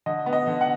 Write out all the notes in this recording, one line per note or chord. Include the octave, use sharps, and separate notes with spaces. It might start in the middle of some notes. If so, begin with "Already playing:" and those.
D3 D#5
B3
D#5
D3
F#5